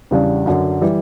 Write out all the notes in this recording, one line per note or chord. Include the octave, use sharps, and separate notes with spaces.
E2 C#3 G3 D4
F#2 D3 F#3
E3 G3